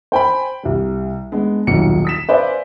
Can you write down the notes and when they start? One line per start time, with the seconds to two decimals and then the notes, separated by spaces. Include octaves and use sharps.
0.12 C5 G5 G#5 B5
0.63 C2 G3
1.32 G#3 B3 D4
1.67 D#1 B1 C#7
2.05 D#6 B6 E7
2.29 B4 C5 D5 E5 F5 G#5